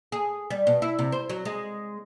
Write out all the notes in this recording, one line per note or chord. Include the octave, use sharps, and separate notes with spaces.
G#4
G3
B2
E4
C3
C5
F#3
G#3